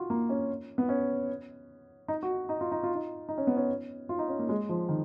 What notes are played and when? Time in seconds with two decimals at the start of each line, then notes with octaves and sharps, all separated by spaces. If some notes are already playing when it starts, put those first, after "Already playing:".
Already playing: F4 F#4
0.10 A#3
0.29 C#4
0.78 B3
0.89 C#4
2.08 D#4
2.23 F#4
2.49 D#4
2.61 F4
2.72 D#4
2.83 F4
2.95 D#4
3.29 D#4
3.38 C#4
3.47 B3
3.56 C#4
4.09 F4
4.19 D#4
4.28 C#4
4.39 A#3
4.49 G#3
4.69 F3
4.89 D#3